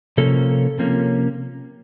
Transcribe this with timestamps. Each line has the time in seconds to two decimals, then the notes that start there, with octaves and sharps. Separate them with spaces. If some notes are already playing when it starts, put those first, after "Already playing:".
0.18 C3 F3 A#3 C#4 A4
0.79 C3 F3 A#3 C#4